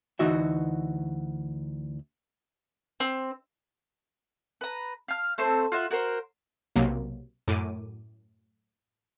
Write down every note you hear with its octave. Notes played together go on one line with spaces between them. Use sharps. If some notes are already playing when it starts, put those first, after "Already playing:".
D2 E3 D#4 F#4 E5
C4
B4 A#5
F5 F6
A3 C4 C5
F4 F#4 E5
F#4 A#4 C5
B1 C3 F#3 A#3
F#2 A2 D6 D#7